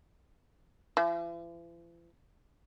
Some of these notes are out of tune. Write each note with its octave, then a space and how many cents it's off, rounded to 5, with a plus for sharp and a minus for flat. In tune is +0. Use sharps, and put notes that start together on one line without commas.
E3 +45